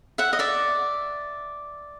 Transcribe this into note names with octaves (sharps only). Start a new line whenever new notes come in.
E5 F#5
D#5
D5 E5